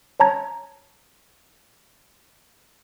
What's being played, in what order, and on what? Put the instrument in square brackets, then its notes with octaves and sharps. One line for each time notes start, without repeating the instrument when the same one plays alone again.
[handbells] C#5 A5 A#5 G#6